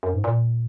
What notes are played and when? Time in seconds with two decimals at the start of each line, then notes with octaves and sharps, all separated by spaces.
0.03 F#2
0.14 G#2
0.24 A#2